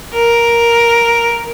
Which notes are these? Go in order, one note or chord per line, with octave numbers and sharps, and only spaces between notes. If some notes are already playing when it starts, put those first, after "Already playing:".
A#4